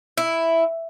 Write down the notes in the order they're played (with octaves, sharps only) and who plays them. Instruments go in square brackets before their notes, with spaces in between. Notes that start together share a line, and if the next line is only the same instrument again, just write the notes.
[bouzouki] E4